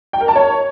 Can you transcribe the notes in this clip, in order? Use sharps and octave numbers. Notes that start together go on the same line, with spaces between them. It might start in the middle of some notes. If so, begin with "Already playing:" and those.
G5
A#4
A5
C#5